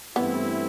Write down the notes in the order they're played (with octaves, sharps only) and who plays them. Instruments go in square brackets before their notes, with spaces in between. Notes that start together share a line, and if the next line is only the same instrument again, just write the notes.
[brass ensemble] G2 E3 A3 C4 E4 [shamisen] B3